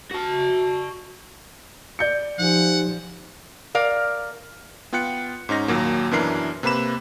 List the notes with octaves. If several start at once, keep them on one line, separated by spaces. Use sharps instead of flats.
F#4 A5
D5 G6 C#7
F3 D#4 G4 F#5 G#5
A#4 D5 F5
B3 F4 G5 F#6 C#7
G#2 C#4 D#4 A#6
D#2 A#2 F#3 A#3
F#2 B2 E3 D4 A#4 C7
C3 A#3 B4 B5 E7